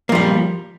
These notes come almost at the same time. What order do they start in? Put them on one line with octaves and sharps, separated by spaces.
A#3 F3 G3